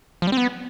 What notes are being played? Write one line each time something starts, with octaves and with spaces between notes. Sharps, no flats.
F3
G3
C4
B3